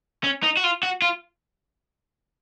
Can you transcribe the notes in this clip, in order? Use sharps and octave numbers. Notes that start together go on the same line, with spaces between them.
C#4
D#4
F#4
F4
F#4
F4